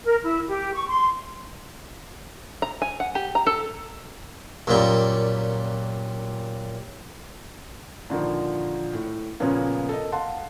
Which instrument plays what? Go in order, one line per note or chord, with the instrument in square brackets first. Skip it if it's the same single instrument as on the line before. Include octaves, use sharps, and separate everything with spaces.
[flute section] A#4
E4
G4
C#6
C6
[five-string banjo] A#5
G#5
F#5
G4
A#5
A4
[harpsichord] F#2 A#2 G3
[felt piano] A#2 D3 D#3 F3
A2
A#2 C#3 F3 A#3 B3 C#4
A4 A#4 D#5
F5 F#5 A5 C6